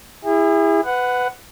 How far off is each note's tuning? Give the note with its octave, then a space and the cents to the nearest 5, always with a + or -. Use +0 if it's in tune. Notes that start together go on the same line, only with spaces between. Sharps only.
E4 +0 G#4 -35
B4 +20 F#5 +0